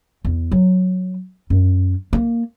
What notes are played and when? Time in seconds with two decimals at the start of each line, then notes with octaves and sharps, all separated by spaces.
0.25 E2
0.52 F#3
1.50 F#2
2.13 A#3